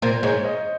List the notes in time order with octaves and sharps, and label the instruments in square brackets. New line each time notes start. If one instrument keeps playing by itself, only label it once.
[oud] A#2 A#3 [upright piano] C5
[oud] G#2 G#3 [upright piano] C#5
[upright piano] D#5